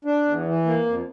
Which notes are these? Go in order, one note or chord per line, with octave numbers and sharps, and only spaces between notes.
D4
E2
E3
A#3
F2